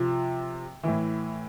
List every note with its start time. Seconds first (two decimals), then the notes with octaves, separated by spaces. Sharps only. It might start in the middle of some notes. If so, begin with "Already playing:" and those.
Already playing: C3 F3
0.83 A2 E3